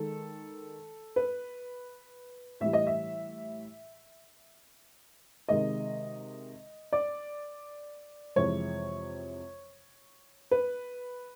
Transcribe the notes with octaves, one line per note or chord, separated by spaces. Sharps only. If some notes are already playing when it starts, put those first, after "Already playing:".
Already playing: D#3 G#3 A4
B4
A2 E3 G3 E5
D#5
E5
C3 D#3 G#3 D#5
D5
F2 C3 E3 G#3 C#5
B4